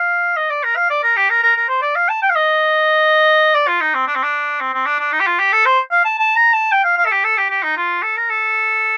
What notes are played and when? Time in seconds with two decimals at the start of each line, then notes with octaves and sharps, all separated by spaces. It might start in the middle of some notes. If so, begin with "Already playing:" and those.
Already playing: F5
0.37 D#5
0.50 D5
0.64 A#4
0.76 F5
0.90 D5
1.03 A#4
1.16 G4
1.30 A#4
1.43 A#4
1.56 A#4
1.69 C5
1.82 D5
1.96 F5
2.09 A5
2.22 G5
2.30 F5
2.36 D#5
3.54 D5
3.67 F4
3.81 D#4
3.94 C4
4.07 D4
4.15 C4
4.23 D4
4.60 C4
4.74 C4
4.86 D4
4.99 D4
5.12 D#4
5.20 G4
5.26 F4
5.39 G4
5.53 A4
5.66 C5
5.91 F5
6.05 A5
6.19 A5
6.36 A#5
6.53 A5
6.72 G5
6.84 F5
6.97 F5
7.06 A4
7.11 G4
7.24 A4
7.37 G4
7.50 G4
7.63 D#4
7.77 F4
8.03 A4
8.17 A#4
8.29 A4